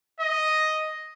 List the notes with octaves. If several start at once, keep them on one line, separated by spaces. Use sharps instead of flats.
D#5